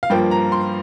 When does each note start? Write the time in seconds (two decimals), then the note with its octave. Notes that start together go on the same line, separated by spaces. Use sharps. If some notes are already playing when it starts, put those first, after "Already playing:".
0.03 F5
0.10 G2 F3 A#3 G5
0.31 A#5
0.52 C6